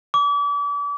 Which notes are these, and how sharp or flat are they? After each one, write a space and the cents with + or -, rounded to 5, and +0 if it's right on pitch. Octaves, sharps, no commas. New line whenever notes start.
D6 -35